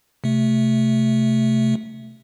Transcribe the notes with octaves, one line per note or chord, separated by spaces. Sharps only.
C3 A3